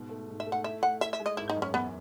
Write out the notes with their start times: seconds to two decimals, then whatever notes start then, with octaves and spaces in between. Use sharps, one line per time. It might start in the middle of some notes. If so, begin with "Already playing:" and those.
Already playing: G#2 B2
0.09 A3
0.28 G#2
0.40 E5
0.46 A3
0.52 F#5
0.64 E4 E5
0.82 A3 F#5
1.01 E4 E5
1.13 E5
1.19 G#3
1.26 D#5
1.37 G#1 E4
1.50 D#4
1.56 F#2
1.62 C#4
1.74 E2 B3